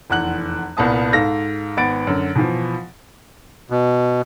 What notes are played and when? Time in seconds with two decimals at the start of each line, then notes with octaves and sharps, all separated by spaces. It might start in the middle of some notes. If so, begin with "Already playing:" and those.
0.10 F1 E2 F#5 F#6 F#7
0.77 C2 A#2 B3 A5 D#6
1.12 G#2 A4 F5 A#6
1.77 G#1 B3 F#5 B5 A6 D7
2.07 F#2 D3
2.35 B2 E3 F3
3.70 B2